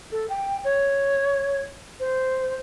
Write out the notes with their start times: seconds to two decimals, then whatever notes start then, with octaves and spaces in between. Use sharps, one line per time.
0.12 A4
0.30 G5
0.64 C#5
2.00 C5